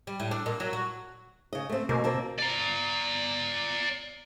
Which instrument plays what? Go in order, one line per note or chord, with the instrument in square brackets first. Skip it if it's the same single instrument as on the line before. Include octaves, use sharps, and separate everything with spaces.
[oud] G3
A2
D4
A#2
F#3
F#4
[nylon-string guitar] C#3 D#5
A3 C4
[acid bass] B2 [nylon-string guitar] A#3
[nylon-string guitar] A#3 C4 A5
[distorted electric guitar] D5 A#5